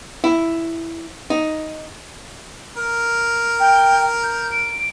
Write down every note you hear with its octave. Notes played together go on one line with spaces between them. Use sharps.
E4
D#4
A#4
G5
G6
D7